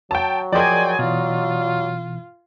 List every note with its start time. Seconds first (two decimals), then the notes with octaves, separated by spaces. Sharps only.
0.11 F#3 G5 A5
0.52 F3 G#4 A#4 D5 D#5 G5 G#5 C6
0.99 B2 E3 F4